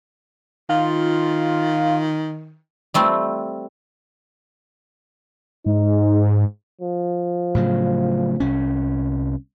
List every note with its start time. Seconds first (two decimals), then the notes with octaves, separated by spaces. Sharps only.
0.69 D#3 F4
2.94 G3 A3 C4 F4
5.66 G#2 D#4
6.81 F3
7.55 A2 C#3 F#3
8.40 C2 C#4